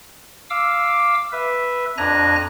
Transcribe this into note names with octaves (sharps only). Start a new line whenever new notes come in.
F5 D6 E6
B4 E5
F2 D4 G#5 A#5 F#6 A#6